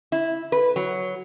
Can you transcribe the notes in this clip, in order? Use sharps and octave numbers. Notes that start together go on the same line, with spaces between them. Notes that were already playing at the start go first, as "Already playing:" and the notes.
E4
B4
F#3